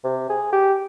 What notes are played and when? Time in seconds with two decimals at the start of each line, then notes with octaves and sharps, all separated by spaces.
0.04 C3
0.30 G#4
0.52 G4